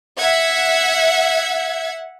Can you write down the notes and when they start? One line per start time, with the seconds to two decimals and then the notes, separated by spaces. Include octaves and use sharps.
0.18 E5 F#5 G#6